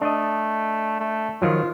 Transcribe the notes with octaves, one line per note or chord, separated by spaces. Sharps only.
A3 D4 D#5
A3
D#3 F3 F#3 F4